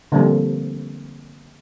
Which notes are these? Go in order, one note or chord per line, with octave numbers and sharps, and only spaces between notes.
D3 F3 G3 A#3 C4